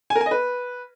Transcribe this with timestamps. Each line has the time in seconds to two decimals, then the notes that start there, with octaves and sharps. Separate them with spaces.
0.10 G#5
0.16 A#4
0.21 G#5
0.26 D#5
0.31 B4